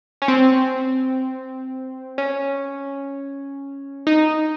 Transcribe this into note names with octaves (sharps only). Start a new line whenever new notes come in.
C#4
C4
C#4
D#4